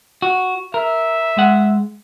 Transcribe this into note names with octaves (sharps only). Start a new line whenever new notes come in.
F#4
A#4 E5
G#3 F#5